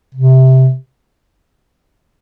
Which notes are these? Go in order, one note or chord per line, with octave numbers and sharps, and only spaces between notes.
C3